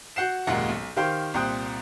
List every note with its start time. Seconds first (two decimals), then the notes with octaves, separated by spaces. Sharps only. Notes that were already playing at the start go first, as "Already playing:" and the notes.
0.16 F#4 F#5 G6 C7 E7
0.47 F#1 D#2 A#2 G#3 A#3 F#5
0.69 B1
0.96 D#3 G4 C5 F5 G5 G6
1.34 C2 A#2 C5 G5 D#6 F#6